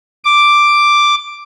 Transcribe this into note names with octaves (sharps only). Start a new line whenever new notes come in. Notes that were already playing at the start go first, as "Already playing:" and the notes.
D6